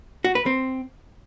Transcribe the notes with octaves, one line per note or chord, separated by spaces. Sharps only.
F#4
B4
C4